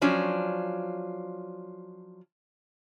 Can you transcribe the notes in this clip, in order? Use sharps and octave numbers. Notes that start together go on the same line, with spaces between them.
F3 F#3 C#4 D4 F4